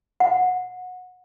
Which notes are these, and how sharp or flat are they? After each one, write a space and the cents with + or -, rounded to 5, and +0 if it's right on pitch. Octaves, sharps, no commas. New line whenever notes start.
F#5 -20